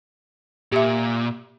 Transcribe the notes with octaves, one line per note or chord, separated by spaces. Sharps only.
A#2 G4 E5